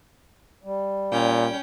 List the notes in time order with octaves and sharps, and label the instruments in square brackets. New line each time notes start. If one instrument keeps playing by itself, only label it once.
[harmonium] G3
[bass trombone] A#2 [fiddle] C#4 G5